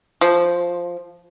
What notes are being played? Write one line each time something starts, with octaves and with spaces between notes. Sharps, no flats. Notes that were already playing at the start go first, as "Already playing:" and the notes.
F3